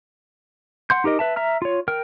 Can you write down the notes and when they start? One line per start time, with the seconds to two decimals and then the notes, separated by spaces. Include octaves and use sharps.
0.90 F#5 C6 G6
1.04 D#4 G4 A#4 D#5
1.19 B4 E5 A5
1.36 E5 A#5 F6
1.62 F4 C#5
1.88 A#4 G5 F6